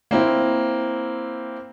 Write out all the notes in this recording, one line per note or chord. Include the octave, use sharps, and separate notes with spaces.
A#3 C4 E4